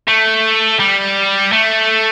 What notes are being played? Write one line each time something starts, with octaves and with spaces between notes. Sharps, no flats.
A3
G3
A3